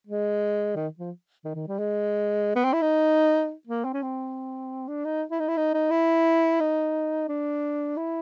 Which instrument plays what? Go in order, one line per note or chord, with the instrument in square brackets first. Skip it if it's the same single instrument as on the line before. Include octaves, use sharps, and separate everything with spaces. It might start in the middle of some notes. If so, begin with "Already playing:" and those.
[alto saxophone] G#3
D#3
F3
D#3
D#3
G3
G#3
B3
C4
E4
D#4
A#3
C4
C#4
C4
D4
D#4
E4
D#4
E4
D#4
D#4
E4
D#4
D4
E4